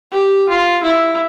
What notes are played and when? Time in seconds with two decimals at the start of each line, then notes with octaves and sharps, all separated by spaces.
0.12 G4
0.49 F4
0.83 E4